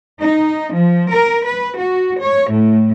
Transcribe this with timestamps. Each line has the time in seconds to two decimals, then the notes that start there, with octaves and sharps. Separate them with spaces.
0.19 D#4
0.73 F3
1.09 A#4
1.46 B4
1.75 F#4
2.19 C#5
2.51 A2